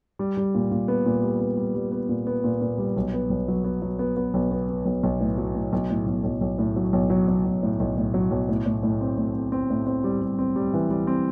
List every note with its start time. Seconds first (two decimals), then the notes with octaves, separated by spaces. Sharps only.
0.19 G3
0.37 G3
0.55 A#2
0.71 A#2
0.88 B3
1.06 A#2
1.24 G3
1.40 B3
1.57 G3
1.75 G3
1.92 B3
2.09 A#2
2.27 B3
2.44 A#2
2.61 A#2
2.78 G3
2.96 B1
3.13 B3
3.30 B1
3.48 F#3
3.64 B3
3.82 F#3
3.99 B3
4.17 B3
4.34 B1
4.51 B3
4.69 B3
4.86 B1
5.04 B1
5.21 A2
5.38 F#3
5.55 A2
5.73 B1
5.90 A2
6.07 B1
6.24 B1
6.41 B1
6.59 A2
6.76 F#3
6.93 B1
7.10 F#3
7.28 F#3
7.44 B1
7.63 A2
7.80 B1
7.97 A2
8.14 F#3
8.31 B1
8.49 A2
8.66 A2
8.83 A2
9.01 C4
9.18 A2
9.36 C4
9.52 C4
9.70 A2
9.87 C4
10.04 G3
10.22 G3
10.39 C4
10.56 G3
10.74 E3
10.90 G3
11.07 C4